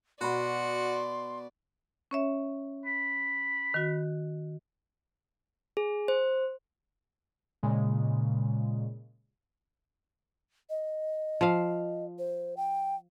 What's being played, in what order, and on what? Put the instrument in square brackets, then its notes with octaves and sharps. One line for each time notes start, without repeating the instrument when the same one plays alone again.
[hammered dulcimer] B2 B4 [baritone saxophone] F#4 [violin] D5 [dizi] C6
[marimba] C#4 C#5 E5
[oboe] B5
[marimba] D#3 F#4
[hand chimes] G#4
C5
[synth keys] A#2 C#3 G#3
[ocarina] D#5
[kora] F3 F5
[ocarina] C5
G5